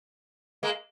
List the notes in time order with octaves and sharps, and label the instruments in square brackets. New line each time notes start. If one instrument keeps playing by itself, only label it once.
[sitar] G#3 A#3